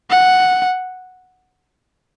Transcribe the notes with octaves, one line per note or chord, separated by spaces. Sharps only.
F#5